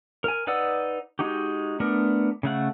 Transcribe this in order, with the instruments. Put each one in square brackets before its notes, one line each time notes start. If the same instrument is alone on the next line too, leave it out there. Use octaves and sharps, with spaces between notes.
[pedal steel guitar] A#4 G#5
D#4 B4 D5 F#5 E6
G#3 D#4 F#4 G4
A3 B3 D4 A#4
C#3 A3 F#5